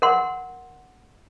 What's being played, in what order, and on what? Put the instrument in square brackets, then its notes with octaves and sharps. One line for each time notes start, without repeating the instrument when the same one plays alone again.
[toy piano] A#4 F#5 C6